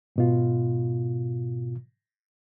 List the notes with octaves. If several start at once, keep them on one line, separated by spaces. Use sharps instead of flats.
G#2 B2 F4